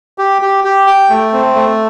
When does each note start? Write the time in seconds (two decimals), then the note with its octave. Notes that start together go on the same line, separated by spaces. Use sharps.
0.18 G4
0.42 G4
0.64 G4
0.87 G5
1.09 A3
1.33 C4
1.55 A3